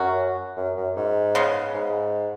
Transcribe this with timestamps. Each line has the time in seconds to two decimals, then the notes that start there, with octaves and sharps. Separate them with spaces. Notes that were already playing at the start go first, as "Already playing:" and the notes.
Already playing: F#2 F#3 C#4 F#4
0.57 F#2
0.77 F#2
0.96 G#2
1.35 C#3 G#3 B3
1.74 G#2